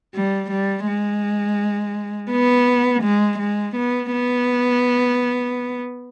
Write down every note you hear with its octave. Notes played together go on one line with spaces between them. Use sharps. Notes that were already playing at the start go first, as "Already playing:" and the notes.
G3
G3
G#3
B3
G#3
G#3
B3
B3